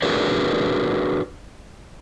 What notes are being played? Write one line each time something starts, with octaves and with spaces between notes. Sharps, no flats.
D4 F#4 G#4 A#4 B4 C#5